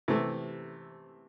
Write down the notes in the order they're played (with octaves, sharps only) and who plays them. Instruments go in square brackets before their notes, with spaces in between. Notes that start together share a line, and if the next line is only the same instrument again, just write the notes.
[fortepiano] C3 E3 A3